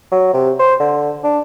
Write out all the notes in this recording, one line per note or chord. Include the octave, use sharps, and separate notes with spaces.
F#3
C3
C5
D3
D4